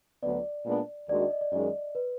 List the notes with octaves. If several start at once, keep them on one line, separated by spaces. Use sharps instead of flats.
D2 D3 F#3 B3 D5
A#2 G#3 B3 D4
D#2 D#3 G#3 D4 F#4 D5
D#5
D#5
D5
F#2 D#3 G#3 D5
B4